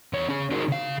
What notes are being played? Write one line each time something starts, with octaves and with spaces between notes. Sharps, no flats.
E2 C#5
C#4 G#4
D#4 F#4 G#4 A#4 C5 D5
C#3 F5